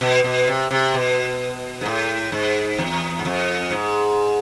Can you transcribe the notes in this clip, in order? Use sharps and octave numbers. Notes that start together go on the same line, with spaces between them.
B2
B2
C3
C3
B2
G#2
A2
G#2
E2
G#2
F2
G#2